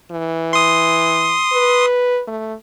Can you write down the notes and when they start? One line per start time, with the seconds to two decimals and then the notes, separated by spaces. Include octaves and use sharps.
0.11 E3
0.53 C6 D#6
1.53 B4
2.28 A3